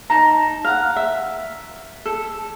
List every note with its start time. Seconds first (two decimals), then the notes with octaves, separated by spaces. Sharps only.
0.10 D#4 A5 A#5
0.64 F5 F#5
0.96 E5
2.05 A4